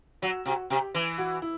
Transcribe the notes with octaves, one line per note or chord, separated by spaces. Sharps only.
F#3 F#4
C3 F#4
C3 G4
E3
F#4
E4